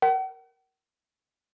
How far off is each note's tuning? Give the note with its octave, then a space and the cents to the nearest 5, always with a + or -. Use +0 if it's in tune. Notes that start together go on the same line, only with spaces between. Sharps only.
A#4 +0 F#5 +45